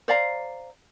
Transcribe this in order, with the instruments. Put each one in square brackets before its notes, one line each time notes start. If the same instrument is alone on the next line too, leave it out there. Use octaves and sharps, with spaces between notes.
[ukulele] C5 D5 F5 A#5